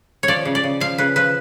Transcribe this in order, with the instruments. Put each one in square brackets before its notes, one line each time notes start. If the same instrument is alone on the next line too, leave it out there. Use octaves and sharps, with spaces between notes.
[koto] C#5
F3 D5
C#3
D5
C#3
F3 F5
C#3 B4
F3 B4